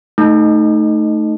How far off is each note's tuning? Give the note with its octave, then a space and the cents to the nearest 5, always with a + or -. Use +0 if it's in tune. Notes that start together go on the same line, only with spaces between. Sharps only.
A3 +0 D#4 +0